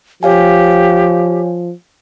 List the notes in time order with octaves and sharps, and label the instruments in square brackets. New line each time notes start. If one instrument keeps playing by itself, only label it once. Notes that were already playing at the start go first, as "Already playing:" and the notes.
[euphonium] F3 [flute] G4 [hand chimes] C#5 F5 G#5